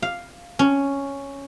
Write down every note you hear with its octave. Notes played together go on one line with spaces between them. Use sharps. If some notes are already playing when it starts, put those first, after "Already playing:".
F5
C#4